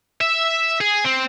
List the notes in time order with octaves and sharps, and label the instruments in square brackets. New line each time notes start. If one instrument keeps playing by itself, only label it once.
[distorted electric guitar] E5
G#4
C4